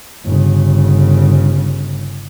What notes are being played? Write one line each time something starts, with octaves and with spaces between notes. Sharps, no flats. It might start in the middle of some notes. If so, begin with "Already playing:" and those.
G1 C#3